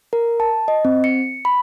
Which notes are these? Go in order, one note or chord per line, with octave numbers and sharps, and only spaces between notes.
A#4
A5
D#5
C4
C#7
B5